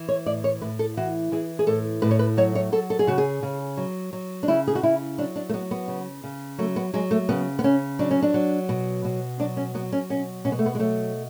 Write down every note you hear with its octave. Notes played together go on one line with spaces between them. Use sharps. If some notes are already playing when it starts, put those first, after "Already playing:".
Already playing: E3
C#5
A2 D5
C#5
A2 B4
A4
E3 F#4
E3 G#4
G#4
A2 A4
A2 B4
C#5
B4
F#3 C#5
C#5
F#3 A4
A4
G#4
C#3 F#4
G#4
C#3
F#3
F#3
D4
C#3 E4
G#4
F#4
C#3 E4
F#3 D4
D4
A3
F#3 B3
B3
C#3
C#3
F#3 A3
B3
F#3 G#3
A3
C#3 B3
B3
C#3 C#4
F#3 D4
C#4
D4
F#3
B2
B2
F#3 D4
C#4
F#3 B3
C#4
B2 C#4
B2 C#4
B3
A3
B3
G#3
F#3 A3